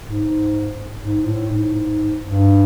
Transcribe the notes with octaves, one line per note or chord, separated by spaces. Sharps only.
G#2
G#2
A2
G#2
G2